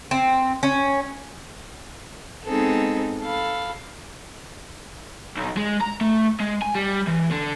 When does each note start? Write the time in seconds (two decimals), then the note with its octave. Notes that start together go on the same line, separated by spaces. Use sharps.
0.11 C4
0.63 C#4
2.45 G#3 B3 C4 D#4 G#4 A4
3.21 A4 F5 B5
5.36 B1
5.57 G#3
5.81 A#5
6.01 A3
6.40 G#3
6.62 G#5
6.75 G3
7.07 E3
7.31 D3